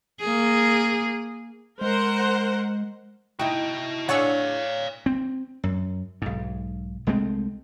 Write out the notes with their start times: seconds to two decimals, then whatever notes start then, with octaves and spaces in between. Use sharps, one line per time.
0.20 A#3 G#4
1.81 G#3 A#4 C5 F#5
3.39 D#4 E4 F#4 D#5 G5
4.09 D4 G#4 C#5 D5 F5 F#5 C#6 E6
5.06 C4
5.64 F#2
6.22 B1 G#2
7.07 C2 G#3 A3 C4